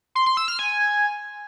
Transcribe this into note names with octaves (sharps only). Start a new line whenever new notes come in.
C6
C6
E6
F6
G#5